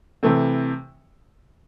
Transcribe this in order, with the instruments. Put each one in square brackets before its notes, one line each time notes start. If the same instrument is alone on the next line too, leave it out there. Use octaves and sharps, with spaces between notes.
[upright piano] C3 E3 A3 C4